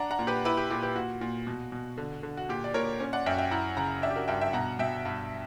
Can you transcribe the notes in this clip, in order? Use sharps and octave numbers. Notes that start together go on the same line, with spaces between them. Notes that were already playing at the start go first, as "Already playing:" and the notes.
Already playing: D4 F#5 A#5
F#5 A#5
A#2
G4 B4
E4 G4 B4
G4
A#2 G4
G4 B4
A#2 F#4
A#2
B2
B2
D3
D3
F#4
A#2 G4
D5
A#2 A#4 C#5
C#4
D5 F#5
F#2 E5 G5
E5 G5
E4 F#5 A#5
C#3 F#5 A#5
D4 E5 G5
G4
F#4 A#4
G2 E5 G5
E5 G5
B2 F#5 A#5
B2 E5 G5
G2